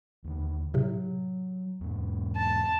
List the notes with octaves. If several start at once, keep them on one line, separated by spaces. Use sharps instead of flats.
D#2 D3
A2 C3 F#3
E2 G#2
A5